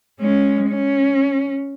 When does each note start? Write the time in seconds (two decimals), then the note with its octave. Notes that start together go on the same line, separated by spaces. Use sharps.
0.20 G#3 C#4
0.69 C#4